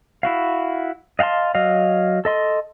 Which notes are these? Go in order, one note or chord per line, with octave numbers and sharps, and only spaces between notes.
E4 F#4 F5
D#5 F5 F#5 A5 C6
F#3 D#5 F5
A4 D#5 C6